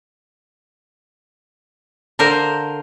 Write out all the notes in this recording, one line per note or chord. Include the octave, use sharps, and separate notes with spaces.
D3 A#4 C5 F5